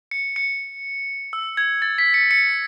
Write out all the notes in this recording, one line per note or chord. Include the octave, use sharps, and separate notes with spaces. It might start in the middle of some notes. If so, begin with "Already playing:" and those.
C#7
C#7
E6
G#6
A6
B6
C#7
C#7